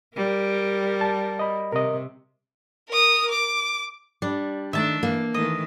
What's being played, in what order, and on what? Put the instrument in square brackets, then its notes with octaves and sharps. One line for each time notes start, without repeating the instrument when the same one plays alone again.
[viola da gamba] G3 A#4
[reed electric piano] A5
D#5 B5
[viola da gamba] C3 [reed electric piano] A#4 D#5
[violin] A#4 D#6
D6
[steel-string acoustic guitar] G3 [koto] D4
[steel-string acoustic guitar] D#3 [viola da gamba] A3 D4 [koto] E5 A5
[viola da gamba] E3 [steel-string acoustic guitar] A#3
[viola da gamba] D#3 E3 A3 [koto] D#5